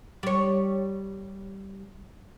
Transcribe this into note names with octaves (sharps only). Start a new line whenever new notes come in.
G3 C#5